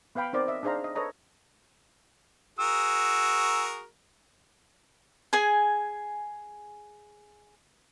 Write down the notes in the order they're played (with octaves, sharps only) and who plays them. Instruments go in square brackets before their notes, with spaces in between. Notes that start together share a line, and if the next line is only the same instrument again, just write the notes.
[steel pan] B3 B4 F5 G5 B5
C4 D#4 A#4 C5 D5
D#5 E5
D4 D#4 G#4 C5 F5 A#5
D#5
A4 B4 C#5 D#5 A#5
[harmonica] F#4 G#4 A#4 [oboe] E6
[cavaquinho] G#4 G#5